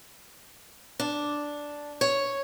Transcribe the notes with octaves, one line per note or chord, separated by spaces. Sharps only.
D4
C#5